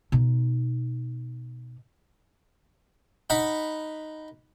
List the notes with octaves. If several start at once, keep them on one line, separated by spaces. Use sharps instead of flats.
B2 D#4
D#4 F#5 B5